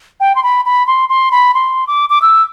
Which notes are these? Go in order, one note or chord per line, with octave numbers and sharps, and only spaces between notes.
G5
C6
B5
B5
C6
C6
B5
C6
D6
D6
E6